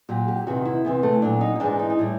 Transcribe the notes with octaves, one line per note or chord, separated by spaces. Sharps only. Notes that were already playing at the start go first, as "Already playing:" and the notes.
A#2 F#3 G4
G4
E2 C3 D#3 F#4
E4
E2 C3 E3 B3
A3
A#2 F#3 D4
D#4
D#4
G#2 E3 G#3 D4
D#4
D#4
A2 E3 G3 E4